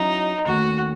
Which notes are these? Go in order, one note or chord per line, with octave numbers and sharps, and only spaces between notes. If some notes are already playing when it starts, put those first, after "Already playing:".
Already playing: F#3 C#4 D#4 E4
D#2 D#3 A3 C#4 F#4